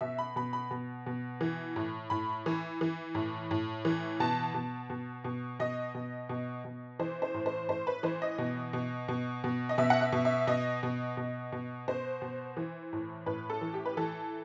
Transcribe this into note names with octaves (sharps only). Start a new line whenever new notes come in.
B2 E5
B5
B2 B5
B5
B2
B2
E3
A2
A2 B5
E3
E3
A2
A2
E3
B2 A5
B2
B2
B2
B2 D#5
B2
B2
B2
E3 C5
C5
A2
C5
A2 C5
B4
E3 C5
D#5
B2
B2
B2
B2
D#5
B2 E5
F#5
E5
B2
E5
B2 D#5
B2
B2
B2
B2 C5
B2
E3
A2
A2 B4
A4
E3
G4
B4
E3 A4